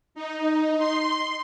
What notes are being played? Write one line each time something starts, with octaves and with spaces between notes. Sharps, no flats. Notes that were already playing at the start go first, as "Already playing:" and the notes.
D#4
C6